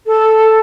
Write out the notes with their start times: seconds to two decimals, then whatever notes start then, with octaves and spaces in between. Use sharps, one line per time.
0.06 A4